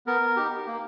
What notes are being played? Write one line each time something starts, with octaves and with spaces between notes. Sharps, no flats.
B3 A#4
D#4 G4
A#3